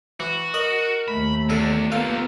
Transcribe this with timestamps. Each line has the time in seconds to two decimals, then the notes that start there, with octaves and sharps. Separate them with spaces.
0.20 E3 F#4
0.54 A#4 D#5
1.08 D#2 A3 B5
1.50 E2 D4 A4
1.92 A#3 B3 F4 G4 A4 F5